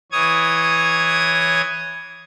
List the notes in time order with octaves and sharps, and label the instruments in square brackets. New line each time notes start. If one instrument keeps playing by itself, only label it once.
[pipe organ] E3 C#5 D#6 G#6